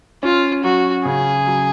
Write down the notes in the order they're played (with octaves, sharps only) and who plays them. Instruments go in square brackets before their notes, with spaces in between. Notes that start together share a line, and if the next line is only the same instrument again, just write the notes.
[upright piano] C#4 [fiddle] F4
[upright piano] F#3 [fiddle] F#4
[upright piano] C#3 [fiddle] G#4
[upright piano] F#3